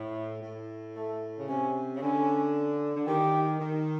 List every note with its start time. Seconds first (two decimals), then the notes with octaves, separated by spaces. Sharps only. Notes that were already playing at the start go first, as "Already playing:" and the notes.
Already playing: A2
0.42 A2
0.96 A3
1.37 C#3
1.49 C3 C#4
1.95 C#3
2.02 D3 C#4
2.96 D3
3.07 D#3 G4
3.60 D#3